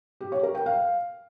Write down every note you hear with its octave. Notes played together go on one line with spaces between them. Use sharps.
G4
C#5
A#4
G5
F5